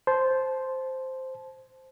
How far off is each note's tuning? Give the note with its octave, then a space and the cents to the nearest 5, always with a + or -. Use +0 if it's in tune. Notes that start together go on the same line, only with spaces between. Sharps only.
C5 +0 A5 -25